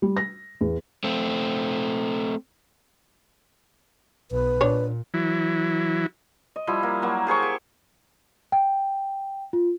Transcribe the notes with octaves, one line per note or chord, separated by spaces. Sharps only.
G3
A#6
E2
A3 C4
B1 B4
A#2 D4 C#5
E3 F#3 E4
D#5
F3 G3 E4
A#3
F#3 A#3
G4 G#4 C5 C#6
G4
G5
F4